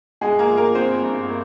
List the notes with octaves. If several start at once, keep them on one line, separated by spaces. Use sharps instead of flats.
G1 G#3 G#4
A#3 A#4
F3
A#3 A#4
G1 C4 C5
G2
A#3